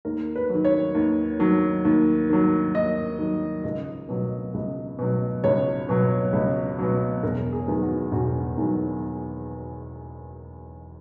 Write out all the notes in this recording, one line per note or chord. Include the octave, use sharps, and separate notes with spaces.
D#2 A#4
B4
F#3
D#3
C#5
D#2
D#3 F#3
D#2
D#3 F#3
D#2 D#5
D#3 F#3
C#2 D#5
B2 F#3
C#2
B2 F#3
C#2 C#5
B2 F#3
C#2
B2 F#3
E1 A#4
G#4
E2 D#3 F#3
F#4
E1 F#4
E2 D#3 F#3